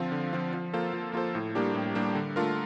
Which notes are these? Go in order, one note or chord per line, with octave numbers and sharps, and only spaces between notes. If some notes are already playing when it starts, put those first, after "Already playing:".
Already playing: D3 F3 C4 F4
D3
F3 C4 F4
F3
A#3 F4 A4 C5
F3
A#3 F4 A4 C5
A2
G3 A#3 D4 G4
A2
G3 A#3 D4 G4
D3
A3 D4 F4 A#4